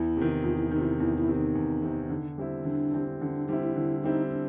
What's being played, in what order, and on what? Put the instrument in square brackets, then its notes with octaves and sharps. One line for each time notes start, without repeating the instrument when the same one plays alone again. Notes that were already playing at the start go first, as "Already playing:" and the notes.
Already playing: [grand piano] E2 [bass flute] E4
[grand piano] C3 D#3
[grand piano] E2 [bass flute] F4
[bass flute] E4
[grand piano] C3 D#3 [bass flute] D#4
[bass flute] F4
E4
[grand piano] E2 [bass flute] E4
[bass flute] E4
[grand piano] C3 D#3
[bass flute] D#4
[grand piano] E2
C3 D#3
D3
G3 C4 E4
[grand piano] D3 [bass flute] D4
[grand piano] G3 C4 E4
[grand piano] D3 [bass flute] C#4
[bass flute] D4
[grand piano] G3 C4 E4 [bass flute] D#4
[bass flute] E4
[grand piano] D3 [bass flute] E4
[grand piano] G3 C4 E4 [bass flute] D#4
[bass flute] D4